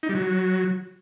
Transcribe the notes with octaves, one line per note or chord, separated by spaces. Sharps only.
D#4
G3
F#3